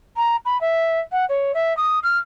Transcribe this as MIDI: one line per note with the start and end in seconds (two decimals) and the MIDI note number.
0.16 0.36 82
0.45 0.60 83
0.61 1.00 76
1.11 1.25 78
1.29 1.52 73
1.54 1.75 76
1.77 1.99 87
2.03 2.18 89